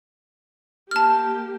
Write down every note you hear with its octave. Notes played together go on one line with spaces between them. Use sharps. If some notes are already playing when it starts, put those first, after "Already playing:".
A#3 G4 A5 F6